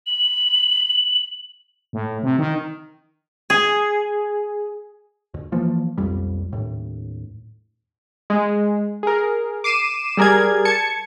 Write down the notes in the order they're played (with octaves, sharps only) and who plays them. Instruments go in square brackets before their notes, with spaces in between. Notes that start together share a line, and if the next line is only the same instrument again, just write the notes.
[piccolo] F#7
[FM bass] A2
C3
D#3
[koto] G#4
[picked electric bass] D2
E3 F3 A#3
B1 F2 G3
D#2 A2
[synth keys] G#3
G#4 A#4
D6 C7 D#7 E7
G3 G#4 A#4 D5 G#6
A5 G#6 C#7